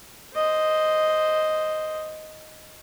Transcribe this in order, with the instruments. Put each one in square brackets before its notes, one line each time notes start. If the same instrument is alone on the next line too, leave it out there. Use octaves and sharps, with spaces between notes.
[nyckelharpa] C5 D#5